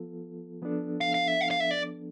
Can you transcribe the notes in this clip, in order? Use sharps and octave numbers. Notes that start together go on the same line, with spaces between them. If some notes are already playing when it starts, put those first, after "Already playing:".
Already playing: F3 B3 F4 A4
F3 B3 D4 A4
F5
F5
E5
F5
F5
E5
D5